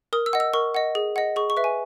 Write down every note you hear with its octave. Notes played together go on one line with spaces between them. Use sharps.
A#4 D#6
E6
D#5 F#5
E6
A#4 C#6
D#5 F#5
G#4
D#5 F#5
G#4 C#6
C#6
B4 E5
G#5